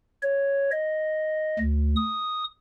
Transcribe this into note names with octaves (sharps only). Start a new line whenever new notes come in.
C#5
D#5
D2
D#6